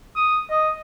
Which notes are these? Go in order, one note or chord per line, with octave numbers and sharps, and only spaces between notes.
D#6
D#5